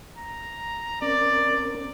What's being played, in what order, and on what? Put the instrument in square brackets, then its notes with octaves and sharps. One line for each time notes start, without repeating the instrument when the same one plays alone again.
[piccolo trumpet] A#5
[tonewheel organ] C4 C#4 A#4 [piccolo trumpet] D5